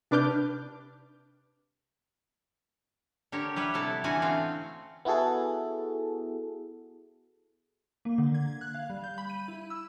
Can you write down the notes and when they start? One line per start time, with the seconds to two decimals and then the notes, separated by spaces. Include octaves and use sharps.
0.11 C3 D4 B4 D6 F6 G6
3.32 D3 G4 A#4 C#5
3.56 G3 B4 C#5 E5
3.74 C3 B3 E4 A4
4.04 D3 E3 B3 C#4 F#4 G#5
4.22 A3 C4 F5
5.05 B3 E4 F#4 G#4 A4
8.05 A#3
8.18 D3
8.34 G#6
8.61 F#6
8.74 F5
8.90 G3
9.04 G6
9.18 B5
9.30 D#7
9.48 E4
9.70 E6